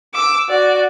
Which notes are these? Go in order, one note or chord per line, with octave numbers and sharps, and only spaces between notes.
D6 E6
F#4 D5